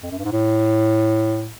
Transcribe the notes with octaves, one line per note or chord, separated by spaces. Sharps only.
F2
F#2
G2
G#2
A2